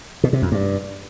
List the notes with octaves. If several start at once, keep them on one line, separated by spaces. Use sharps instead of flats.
B2
C3
F2
G2